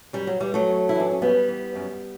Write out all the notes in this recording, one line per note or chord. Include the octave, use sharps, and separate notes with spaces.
F#2 G3
F#3
E3 G3
F#3 A3
F#2
E4
E3 D4
C#4
F#2 G3 B3
E3
F#2